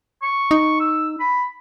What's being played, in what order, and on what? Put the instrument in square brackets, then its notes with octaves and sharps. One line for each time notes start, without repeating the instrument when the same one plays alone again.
[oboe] C#6
[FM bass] D#4
[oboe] E6
B5